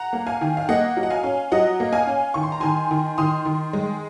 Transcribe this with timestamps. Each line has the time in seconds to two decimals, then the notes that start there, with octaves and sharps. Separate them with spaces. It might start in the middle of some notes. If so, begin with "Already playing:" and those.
Already playing: F#5 A#5
0.13 A#3
0.27 F5 G#5
0.41 D#3
0.57 F5
0.69 A#3 D#5 F#5
0.97 F#3
1.03 F#5
1.10 F5 G#5
1.24 C#4
1.52 F#3 D#5 F#5
1.80 A#3
1.93 F5 G#5
2.07 C#4
2.34 D#3 C#6
2.43 C6
2.52 A#5
2.60 D#3 G#5 C6
2.91 D#3
3.18 D#3 C6 D#6
3.45 D#3
3.73 G#3